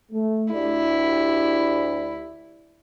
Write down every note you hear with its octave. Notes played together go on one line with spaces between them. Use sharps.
A3
D2 E4 G4 D5